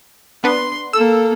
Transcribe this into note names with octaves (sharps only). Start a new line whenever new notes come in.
B3 D4 B4 C6
A#3 A4 E6